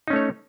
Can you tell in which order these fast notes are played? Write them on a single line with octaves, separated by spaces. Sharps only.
D#4 C#4 A3 C#5